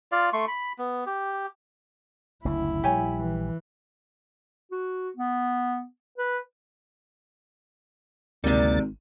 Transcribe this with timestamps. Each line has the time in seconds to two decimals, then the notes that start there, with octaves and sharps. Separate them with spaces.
0.12 F4 D5 F5
0.33 A3 C6 C#6
0.48 B5
0.78 B3
1.06 G4
2.45 F#1 D2 C#3 E4
2.84 A#1 G3 G4 C#5 G#5
3.18 E3
4.72 F#4
5.17 B3
6.18 B4
8.44 G#1 D2 C3 G3 A#3 A6